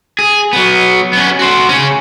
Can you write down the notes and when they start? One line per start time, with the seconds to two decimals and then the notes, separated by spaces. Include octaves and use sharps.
0.19 G#4
0.53 F#3 B3
1.13 B3 C#4
1.39 F#4 C5
1.69 C#3 C#4